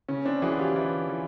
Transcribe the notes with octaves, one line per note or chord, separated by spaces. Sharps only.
C#3 C#4
C4 D4
E3 F#4 G#4
F4 G4
E3
E3